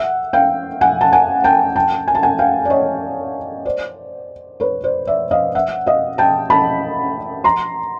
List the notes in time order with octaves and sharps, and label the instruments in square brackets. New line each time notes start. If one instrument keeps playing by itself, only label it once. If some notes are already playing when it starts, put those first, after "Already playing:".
Already playing: [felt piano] E5 F#5
F5 G5
F#5 G#5
A5
F#5 G#5
G5 A5
G5 A5
G#5
A5
F#5 G#5
F5 G5
D5
C#5 D#5
C5 D5
B4 C#5
C5 D5
D5 E5
D#5 F5
E5 F#5
D#5 F5
G5 A5
A5 B5
A#5 C6